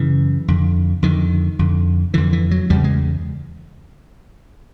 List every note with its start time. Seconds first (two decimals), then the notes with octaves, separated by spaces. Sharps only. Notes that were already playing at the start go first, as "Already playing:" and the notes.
Already playing: F#2 C#3 E3
0.48 F2 D3
1.03 F2 D3 D#3
1.59 F2 D3
2.14 F2 D3 E3
2.33 E3
2.51 F#3
2.70 E2 C#3 G3
2.84 G#3